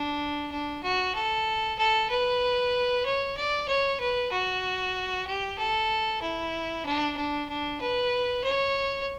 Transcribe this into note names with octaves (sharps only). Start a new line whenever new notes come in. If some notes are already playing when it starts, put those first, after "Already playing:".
Already playing: D4
D4
F#4
A4
A4
B4
C#5
D5
C#5
B4
F#4
G4
A4
E4
D4
D4
D4
B4
C#5